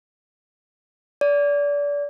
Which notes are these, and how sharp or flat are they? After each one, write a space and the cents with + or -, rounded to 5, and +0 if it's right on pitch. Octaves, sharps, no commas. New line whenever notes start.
D5 -30